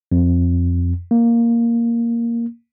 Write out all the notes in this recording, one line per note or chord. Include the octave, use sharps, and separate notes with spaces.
F2
A#3